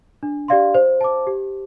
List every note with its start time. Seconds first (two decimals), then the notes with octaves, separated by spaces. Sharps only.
0.23 D4
0.48 G4 D5 F5 C6
0.74 C5
1.01 A5 D6
1.27 G4